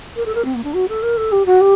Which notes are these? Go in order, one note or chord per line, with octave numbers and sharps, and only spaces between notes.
A#4
A4
A#4
C4
A#3
D4
F#4
A4
A#4
A4
G4
F#4
G4